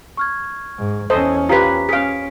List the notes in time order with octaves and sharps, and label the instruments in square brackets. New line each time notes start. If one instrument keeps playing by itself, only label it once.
[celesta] C#6 F6 G#6
[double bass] G#2
[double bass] E2 C#4 [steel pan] A4 C5 D#5
[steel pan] F4 G4 B4 [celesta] A#5 B6
[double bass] C#4 [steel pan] G#4 F5 [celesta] B6 D7